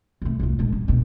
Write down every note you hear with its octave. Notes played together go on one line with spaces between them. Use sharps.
C2 A3
C2 F4
A#1 G#3
G2
A#1 B2